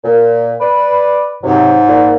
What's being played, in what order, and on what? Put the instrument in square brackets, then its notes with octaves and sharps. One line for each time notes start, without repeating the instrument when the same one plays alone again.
[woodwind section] A#2
B4 D5
[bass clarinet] G#2 [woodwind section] C3 F#3
[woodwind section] A#2